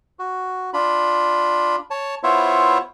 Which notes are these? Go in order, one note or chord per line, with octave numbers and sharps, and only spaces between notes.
F#4
D4 F4 B5
C#5 A5
B3 E4 F4 C5 C#5 E5